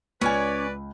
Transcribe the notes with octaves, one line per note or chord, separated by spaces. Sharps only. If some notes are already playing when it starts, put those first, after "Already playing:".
C#2 C#4 B4 C#5 D5 G#5